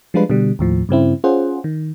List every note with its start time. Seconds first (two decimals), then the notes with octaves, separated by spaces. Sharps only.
0.14 F3 G3 G#3 D4 F4 B4
0.30 B2 D3 G3
0.59 D#2 A2 F3
0.89 G2 C#3 C4 E4
1.24 C#4 F4 G#4 C5 F#5
1.64 D#3